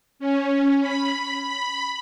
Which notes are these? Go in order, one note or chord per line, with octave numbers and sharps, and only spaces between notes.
C#4
B5
B5